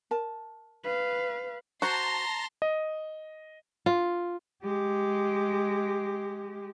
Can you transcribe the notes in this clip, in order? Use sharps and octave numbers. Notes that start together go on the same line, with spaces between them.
A#4 A5
B4 F5
F#4 C5 A5 A#5 C6 A#6
D#5
F4
G#3 G4